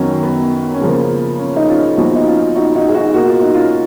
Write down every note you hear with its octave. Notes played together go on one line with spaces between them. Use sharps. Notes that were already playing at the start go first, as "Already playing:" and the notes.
Already playing: F#2 D#3 F#3 B3 C#4
B3
C#4
C#3 F3 A#3 B3
C#4
D#4
C#4 F4
A#2 F3 B3 D#4 F#4
D#4
C#4 F4
D#4 F#4
D#4 F#4
G#4
D#4 F#4
B2 A#3 F#4
F4
D#4
C#4 F4